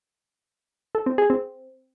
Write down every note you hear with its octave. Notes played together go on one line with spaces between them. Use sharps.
A4
C4
G#4
C4